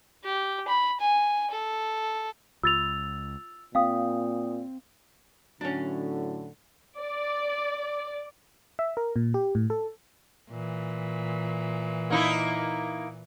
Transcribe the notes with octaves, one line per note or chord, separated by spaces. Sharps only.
G4
B5
G#5
A4
C#2 F4 E6 A6 F7
A#2 C4 F5 G5 D#6
A2 D3 F#3 C#4 D4
D5
E5
A#4
A#2
G4
A2
A4
A#2 E3
A#3 D#4 E4